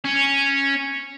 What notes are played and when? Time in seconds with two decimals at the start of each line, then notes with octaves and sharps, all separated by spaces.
0.04 C#4